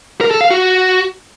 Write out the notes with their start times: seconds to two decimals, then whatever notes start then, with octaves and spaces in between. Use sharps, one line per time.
0.21 A#4
0.31 A4
0.41 F5
0.50 F#4